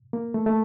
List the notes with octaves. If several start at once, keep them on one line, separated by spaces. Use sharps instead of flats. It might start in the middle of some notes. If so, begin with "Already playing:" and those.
A#3
A3
A3